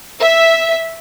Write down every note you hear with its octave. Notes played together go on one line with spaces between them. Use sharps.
E5